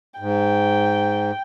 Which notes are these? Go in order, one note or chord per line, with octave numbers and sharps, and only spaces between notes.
G#2 G5